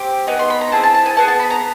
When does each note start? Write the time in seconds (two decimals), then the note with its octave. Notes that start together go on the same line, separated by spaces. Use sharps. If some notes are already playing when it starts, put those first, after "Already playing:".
Already playing: C4 G4
0.27 B3 D#4 G#4
0.39 C6
0.50 B5
0.61 A#5
0.72 C4 E4 G#4 A5
0.83 A5
0.94 A5
1.06 G#5
1.17 B3 E4 G#4 A5
1.28 A5
1.40 B5
1.51 A#5